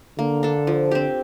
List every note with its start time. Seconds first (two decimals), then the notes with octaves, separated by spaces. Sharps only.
0.18 D3 A#3
0.43 D4 A4
0.67 F3
0.91 C4 G4